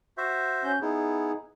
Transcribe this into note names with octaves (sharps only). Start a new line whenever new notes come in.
F#4 C5 E5
C#4 G6
B3 D#4 E4 G#4